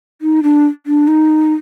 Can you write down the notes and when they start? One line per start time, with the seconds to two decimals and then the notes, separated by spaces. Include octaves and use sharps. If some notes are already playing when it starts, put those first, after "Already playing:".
0.22 D#4
0.43 D4
0.86 D4
1.08 D#4